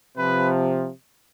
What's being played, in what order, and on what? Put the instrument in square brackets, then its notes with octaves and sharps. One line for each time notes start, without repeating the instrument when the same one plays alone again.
[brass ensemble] C3 F3 B4